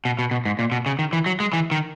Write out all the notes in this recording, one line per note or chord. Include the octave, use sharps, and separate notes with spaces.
B2
B2
B2
G#2
A#2
B2
C#3
D#3
E3
F#3
G#3
E3
D#3